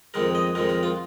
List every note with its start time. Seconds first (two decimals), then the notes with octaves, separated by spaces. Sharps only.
0.14 F2 D#3 G#3 A#4
0.35 D#5
0.55 F2 D#3 G#3 A#4
0.69 A#4
0.83 F4